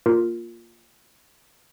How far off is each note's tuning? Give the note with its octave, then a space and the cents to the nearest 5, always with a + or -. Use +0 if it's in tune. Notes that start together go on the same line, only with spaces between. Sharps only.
A#3 +0 F4 +0 A#4 +0